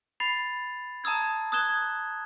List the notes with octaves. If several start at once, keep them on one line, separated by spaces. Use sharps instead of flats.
B5 A6 C7 F7
A5 A#5 D#6 E6 G#6
D#6 E6 F#6 G#6 E7 G7